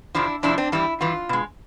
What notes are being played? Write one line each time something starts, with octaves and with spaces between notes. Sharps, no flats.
F2 C3 F3 D4 E4
F2 C3 F3 D4 E4
C4 D4
G2 E3 G3 E4
G2 E3 F4
B2 G#3